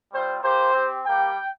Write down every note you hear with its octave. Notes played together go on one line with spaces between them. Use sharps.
G3 C4 F4 C5
A#3 G4 C5
C4 G4
G3 A#3 G4 G5